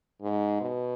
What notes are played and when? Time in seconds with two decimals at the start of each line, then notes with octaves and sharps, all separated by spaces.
0.22 G#2
0.61 B2